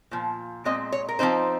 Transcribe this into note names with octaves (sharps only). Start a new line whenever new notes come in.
A#2 F3
A#2 G#3 C4 D#5
C#5
A#4
F3 C4 D#4 C5